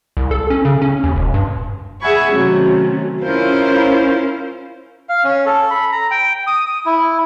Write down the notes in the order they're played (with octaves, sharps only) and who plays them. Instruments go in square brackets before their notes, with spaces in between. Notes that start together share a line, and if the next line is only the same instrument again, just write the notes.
[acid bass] C2
A4
C#4
C#3
C#4
D#2
E1
G2
[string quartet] G#4 E5 F#5 G#5 B5 C#6
C3 D#3 F#3 A3 C#4
C#4 E4 F4 A#4 C5 F5
[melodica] F5
C#4
A4
B5
A#5
G5
D#6
D#6
E4